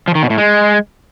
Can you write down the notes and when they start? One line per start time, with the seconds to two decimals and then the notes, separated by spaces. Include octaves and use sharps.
0.08 F3
0.15 D#3
0.23 B2
0.30 A2
0.38 G#3